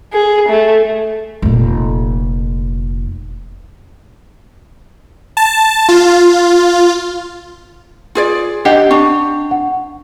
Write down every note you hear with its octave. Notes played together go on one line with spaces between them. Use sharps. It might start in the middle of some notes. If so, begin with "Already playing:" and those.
G#4
A3
F1 A#2
A5
F4
F4 G#4 D5
D4 G4 D#5 F#5 G5 C7
D4 C#6
F#5